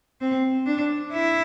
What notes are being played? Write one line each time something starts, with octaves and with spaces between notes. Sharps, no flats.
C4
D4
E4